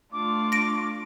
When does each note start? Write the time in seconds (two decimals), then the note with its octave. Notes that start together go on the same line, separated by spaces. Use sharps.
0.12 A3 D4 F4 D6
0.52 A#6 D7